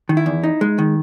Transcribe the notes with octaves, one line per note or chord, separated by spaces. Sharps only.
D#3
E4
E2
D#4
G#3
D#3